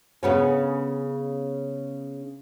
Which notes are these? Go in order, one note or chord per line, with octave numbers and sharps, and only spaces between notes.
C#3 B3 C#4